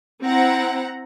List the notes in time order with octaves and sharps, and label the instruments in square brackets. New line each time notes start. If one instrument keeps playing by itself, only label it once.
[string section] C4 E4 F#5 A#5